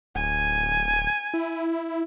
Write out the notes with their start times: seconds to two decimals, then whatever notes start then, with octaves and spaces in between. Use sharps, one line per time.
0.15 D1 G#5
1.34 E4